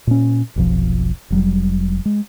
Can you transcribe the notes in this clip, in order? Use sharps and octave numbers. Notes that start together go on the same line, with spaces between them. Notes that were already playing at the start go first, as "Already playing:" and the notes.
A#2 C#4
F1 B1 F3
F1 F#3 G3
G#3